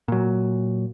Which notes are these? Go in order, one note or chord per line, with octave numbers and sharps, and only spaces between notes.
A#2 F#3